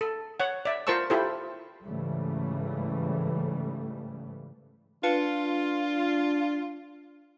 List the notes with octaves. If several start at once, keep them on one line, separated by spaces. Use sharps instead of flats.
A4
C#5 F#5
D5 E5
F4 A#4 C5 A5 C#6 E6
E4 F4 G4 A4 C5
G#2 C#3 E3 G3 A3
D4 F4 B4 A5 C#7